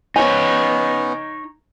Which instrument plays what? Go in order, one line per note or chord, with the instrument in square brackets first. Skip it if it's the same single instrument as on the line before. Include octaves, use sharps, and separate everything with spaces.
[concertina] B3 C#4 [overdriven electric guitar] D#4 C#5 [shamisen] C5 D#5 G#5